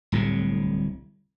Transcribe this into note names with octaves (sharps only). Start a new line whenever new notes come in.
D1 C2 A2 C3